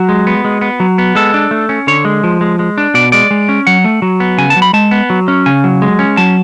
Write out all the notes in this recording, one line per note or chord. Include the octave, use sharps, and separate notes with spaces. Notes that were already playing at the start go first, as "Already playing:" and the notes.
Already playing: F#3 F#4
G#3
B3
G#3
B3
F#3
B3
G#3 A4
D4
A3
C#4
D3 C#5
G#3
F3
G#3
G#3
D4
B2 D5
G#3 D5
G#3
C#4
F#3 F#5
A3
F#3
B3
C#3 G#5
A5
F#3
B5
G#3 A5
B3
F#3
C#4
C#3 G#5
F#3
G#3
C#4
F#3 A5